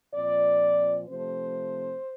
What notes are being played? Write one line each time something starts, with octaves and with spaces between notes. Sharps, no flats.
A#2 F3 C4 D5
C3 F3 A3 C4 C5